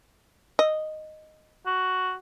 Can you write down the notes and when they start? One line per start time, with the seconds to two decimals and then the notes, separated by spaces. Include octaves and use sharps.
0.59 D#5
1.66 F#4